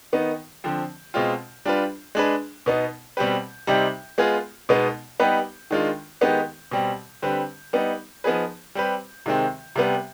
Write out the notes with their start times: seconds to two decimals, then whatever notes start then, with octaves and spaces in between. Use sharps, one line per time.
0.13 D#3 B3 D#4
0.64 D3 F3 C4
1.14 B2 G#3 C4 F4
1.65 G3 D4 F4 B4
2.15 G#3 D4 G#4 B4
2.66 B2 B3 D#4
3.17 B2 G3 C4 G4 B4
3.67 C3 G3 C4 D#4 G4
4.18 G#3 B3 F4 G#4
4.69 B2 G#3 B3 D#4
5.20 G3 B3 D#4 G4 B4
5.71 D#3 G#3 D4 F4
6.21 D#3 G#3 B3 D#4 G4
6.71 B2 G3 C4
7.22 D3 G3 C4 G4 B4
7.73 G3 B3 D#4
8.24 F3 B3 D#4 G#4 B4
8.75 G3 C4 G4 B4
9.26 C3 D#3 G#3 C4
9.76 C3 G3 B3